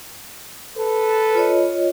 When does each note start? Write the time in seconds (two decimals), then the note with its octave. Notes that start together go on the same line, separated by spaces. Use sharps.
0.78 A4 B4
1.35 F4 C#5 D#5